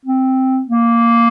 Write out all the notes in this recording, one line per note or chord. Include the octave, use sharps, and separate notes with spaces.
C4
A#3